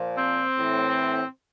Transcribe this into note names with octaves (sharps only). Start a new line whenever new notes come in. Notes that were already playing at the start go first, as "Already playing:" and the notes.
Already playing: A#2 F3
C4
A2 E3